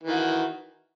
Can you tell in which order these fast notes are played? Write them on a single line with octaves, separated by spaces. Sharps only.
E3 D#3 F#4